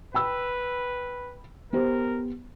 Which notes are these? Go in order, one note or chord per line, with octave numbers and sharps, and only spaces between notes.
B4 G5 B5 E6
B3 G4 A#4 C5